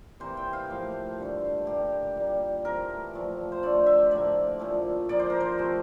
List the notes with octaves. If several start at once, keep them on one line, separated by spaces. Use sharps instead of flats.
C3 E3 A#3 C5
G5
F5
A2 F3 A#3
G2 D3 A3
A2 G3 A#3 G4
A#2 G3 A#3
C3 E3 A3 A#4
A#2 F3 A3
C5
D3 A3 D5
E5
A2 F3 A#3 D5
A#2 F3 A3
A#2 F3 A#3 D5
C5
A#4
C5
C3 F3 A3